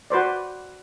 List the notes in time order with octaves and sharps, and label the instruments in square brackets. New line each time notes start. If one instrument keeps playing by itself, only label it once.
[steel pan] F#4 B4 C5 D5